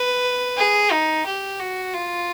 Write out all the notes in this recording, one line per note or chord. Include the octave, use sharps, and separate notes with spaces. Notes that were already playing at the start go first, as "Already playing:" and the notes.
Already playing: B4
G#4
D#4
G4
F#4
F4